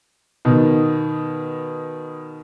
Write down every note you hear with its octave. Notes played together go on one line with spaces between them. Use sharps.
B2 D#3